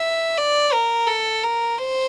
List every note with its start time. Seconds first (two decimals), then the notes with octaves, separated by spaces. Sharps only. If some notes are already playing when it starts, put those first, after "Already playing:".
Already playing: E5
0.38 D5
0.73 A#4
1.07 A4
1.43 A#4
1.78 C5